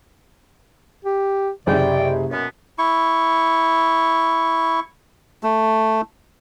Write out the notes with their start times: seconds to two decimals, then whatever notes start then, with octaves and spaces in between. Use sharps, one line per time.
1.05 G4
1.67 F#1 C3 G#4 D5 G5
2.31 F#2 B2 B3
2.78 E4 C#6
5.43 A3